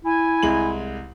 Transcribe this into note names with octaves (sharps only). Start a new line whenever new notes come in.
E4 G#5
C2 G#3 F#7